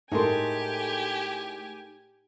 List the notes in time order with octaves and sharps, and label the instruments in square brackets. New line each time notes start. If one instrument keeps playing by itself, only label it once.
[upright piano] A2 G#3 C6 [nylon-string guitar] D#4 A4 A#4 [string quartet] G4 G#5